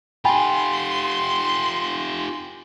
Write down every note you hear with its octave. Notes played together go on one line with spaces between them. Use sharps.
F4 G4 G5 G#5 B5 C6